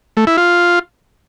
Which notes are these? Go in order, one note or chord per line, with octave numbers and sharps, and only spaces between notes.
A3
E4
F4